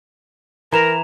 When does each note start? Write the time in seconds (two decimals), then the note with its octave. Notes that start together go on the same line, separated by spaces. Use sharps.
0.72 E3 A#4 A#5 E7 F7